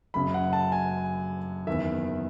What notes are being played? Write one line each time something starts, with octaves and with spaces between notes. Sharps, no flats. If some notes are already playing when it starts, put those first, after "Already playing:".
F#1 F#2 C#3 B5
F#5
A5
G#5
F#1 E2 D#3 E5